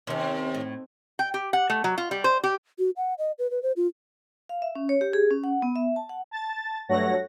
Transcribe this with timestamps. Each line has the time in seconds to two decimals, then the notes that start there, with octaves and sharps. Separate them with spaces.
0.07 D#2 C3 C#4
0.54 A2
1.19 G5
1.34 G4
1.53 F#5
1.70 A3
1.84 F#3
1.98 F4
2.11 G3
2.24 C5
2.44 G4
2.79 F#4
2.97 F#5
3.18 D#5
3.39 B4
3.51 B4
3.63 C5
3.76 F4
4.49 F5
4.62 E5
4.75 C#4
4.89 C#5
5.01 G4
5.13 G#4
5.31 C#4
5.44 F#5
5.62 B3
5.76 E5
5.96 A5
6.09 F#5
6.31 A5 A6
6.89 G2 F#3 A3 C#5 F#5 A#6